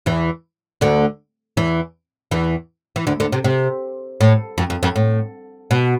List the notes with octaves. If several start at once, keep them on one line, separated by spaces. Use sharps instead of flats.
E2 E3
D2 D3
E2 E3
E2 E3
E3
D2 D3
D2 D3
C3
C3
A2
F2
F2
F2
A2
B2